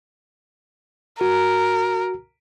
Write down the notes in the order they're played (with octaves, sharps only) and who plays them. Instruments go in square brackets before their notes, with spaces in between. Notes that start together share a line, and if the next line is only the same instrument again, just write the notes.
[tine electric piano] F#4 [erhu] A#4